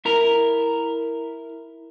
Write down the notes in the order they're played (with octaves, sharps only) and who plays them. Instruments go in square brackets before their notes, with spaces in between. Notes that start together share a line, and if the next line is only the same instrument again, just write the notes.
[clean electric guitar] E4 A#4